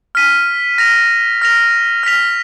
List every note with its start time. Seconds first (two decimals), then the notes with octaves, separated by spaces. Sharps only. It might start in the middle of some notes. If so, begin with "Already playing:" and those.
0.15 F6 B6 D#7
0.78 F6 A#6 F7
1.42 F6 A#6 F7
2.03 F6 B6 F7